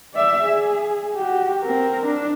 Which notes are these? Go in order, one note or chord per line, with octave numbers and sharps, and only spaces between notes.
D5 E5
G#4
F#4 G4
C4 A#4
D4